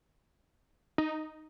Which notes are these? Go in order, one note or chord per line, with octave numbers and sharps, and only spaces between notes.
D#4